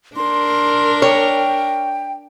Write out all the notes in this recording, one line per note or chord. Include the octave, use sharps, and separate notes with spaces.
D4 A#4 C6
C#5 G5